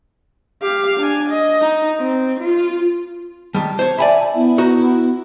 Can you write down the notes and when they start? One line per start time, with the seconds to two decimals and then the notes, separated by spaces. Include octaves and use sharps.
0.62 G4 F5
1.00 D4 G#5
1.29 D#5
1.61 D#4
1.99 C4
2.40 F4
3.55 D#3 G3 A5
3.79 C5 C#5
3.98 D5 E5 G#5 B5
4.35 B3 E4
4.58 D#4 F#4